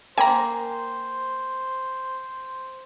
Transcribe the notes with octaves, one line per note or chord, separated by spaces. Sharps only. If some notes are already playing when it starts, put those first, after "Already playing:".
A#3 C5 G5 G#5 A#5